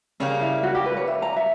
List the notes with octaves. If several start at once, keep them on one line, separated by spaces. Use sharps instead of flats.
C#3 G3 A#3 C#4
E4
F#4
G4
B4
C#5
E5
A#5
E5